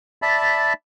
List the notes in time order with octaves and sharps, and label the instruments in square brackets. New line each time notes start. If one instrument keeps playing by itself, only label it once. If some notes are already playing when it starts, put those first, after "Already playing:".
[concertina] D5 E5 A5 B5